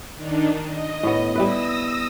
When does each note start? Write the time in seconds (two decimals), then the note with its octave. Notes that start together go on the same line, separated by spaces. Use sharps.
0.15 D#3 D4 D#4
0.62 D#5
1.03 A2 B3
1.35 G3 E4 B4 D#6 E6 A#6